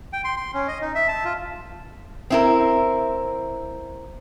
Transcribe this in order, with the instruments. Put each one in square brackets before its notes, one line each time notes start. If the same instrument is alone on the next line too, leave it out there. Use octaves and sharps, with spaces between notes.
[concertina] G5
C6
C6
C#4
D#5
D#4
E5
A5
F4
[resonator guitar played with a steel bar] C4 E4 A#4